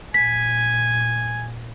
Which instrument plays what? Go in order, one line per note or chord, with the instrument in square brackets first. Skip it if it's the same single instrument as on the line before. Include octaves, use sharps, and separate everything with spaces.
[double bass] A#2 [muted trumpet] G#5 [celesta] B6